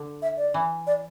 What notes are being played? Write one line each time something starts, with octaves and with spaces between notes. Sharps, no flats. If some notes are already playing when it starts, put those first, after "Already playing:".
Already playing: D3
E5
D5
E3
D5